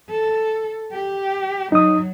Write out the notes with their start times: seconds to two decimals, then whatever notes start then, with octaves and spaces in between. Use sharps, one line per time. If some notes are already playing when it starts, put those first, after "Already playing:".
0.10 A4
0.93 G4
1.72 F#3 D#4 D#6